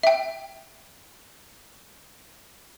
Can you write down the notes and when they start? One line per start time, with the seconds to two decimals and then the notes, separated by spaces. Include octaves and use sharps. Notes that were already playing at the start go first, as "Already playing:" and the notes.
0.03 E5 G5